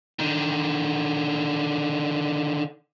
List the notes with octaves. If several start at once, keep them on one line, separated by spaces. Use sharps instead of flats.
D3 D#3